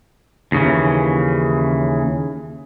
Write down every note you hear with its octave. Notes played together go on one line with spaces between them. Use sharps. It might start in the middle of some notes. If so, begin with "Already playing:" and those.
D#2 C#3 E3